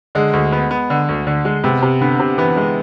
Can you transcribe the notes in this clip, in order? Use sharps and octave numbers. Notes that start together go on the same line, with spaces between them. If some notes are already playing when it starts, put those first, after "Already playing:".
D3 G#3
D2
B3
B3
D3
D2
D3
G#3
C3 B3
C3
D3 B3
C3
E3 B3
G#3